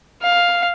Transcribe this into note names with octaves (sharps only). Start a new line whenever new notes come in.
F5